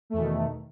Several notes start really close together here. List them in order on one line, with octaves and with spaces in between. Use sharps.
A3 E2 B2 D#3